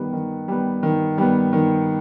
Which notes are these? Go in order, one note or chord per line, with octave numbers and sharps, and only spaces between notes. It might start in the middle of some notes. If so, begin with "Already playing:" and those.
Already playing: D#3 G3 B3
D#3
G3 B3
D#3
G3 B3
D#3